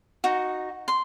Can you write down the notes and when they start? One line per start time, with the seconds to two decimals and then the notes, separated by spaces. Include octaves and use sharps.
0.24 D#4 F#4
0.88 C6